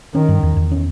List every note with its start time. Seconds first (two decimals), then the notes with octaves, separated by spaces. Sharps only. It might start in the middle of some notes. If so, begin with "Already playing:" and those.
0.14 D#3 C#4
0.28 G2
0.43 E2
0.57 E2
0.71 C#4